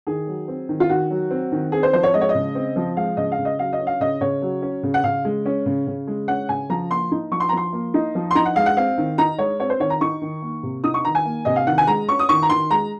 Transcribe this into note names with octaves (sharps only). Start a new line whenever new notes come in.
D#3 G#4
F#3
C4
D#3
F4
D#3 F#4
F#3
C4
D#3
C4 G#4
C5
F3 C5
C#5
G#3 D#5
C#5
D#5
C#3
C4
F3
G#3 F5
C#3 D#5
F5
C#3
D#5
F#3 F5
D#5
C#4
F5
C#3 D#5
C#3 C#5
F#3
C#4
C#3
F#5
C#3 F5
G#3
C#4
C#3
C#3
G#3
C#4 F#5
C#3 G#5
F3 A#5
A#3 C6
D#4
F3 C#6
C6
A#5
F3 C6
A#3
D#4
F3
C6
D#4 A#5
F#5
G#3 F5
F#5
C4 F5
D#3
D#4 A#5
G#3 C#5
C4 C#5
C5
D#3 C#5
A#5
D#4 C#6
D#3
A#3
C3
D#4 D#6
C#6
D#3 A#5
G#5
A#3
C3 D#5
F5
D#3 F#5
G#5
G#3 A#5
C#4 C#6
D#6
D#3 C#6
A#5
D#3 C6
G#3 A#5